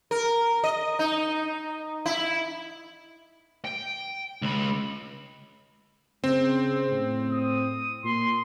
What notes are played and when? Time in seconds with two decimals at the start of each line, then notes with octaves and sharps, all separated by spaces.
0.11 A#4
0.64 D#5
0.99 D#4
2.06 E4
3.65 G5
4.42 C#2 B5
6.24 C#3 C4
6.90 A2
7.32 D#6
8.04 A#2 C6